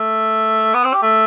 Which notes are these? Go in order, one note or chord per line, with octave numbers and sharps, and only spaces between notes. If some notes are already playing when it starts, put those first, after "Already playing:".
Already playing: A3
B3
C4
G4
A3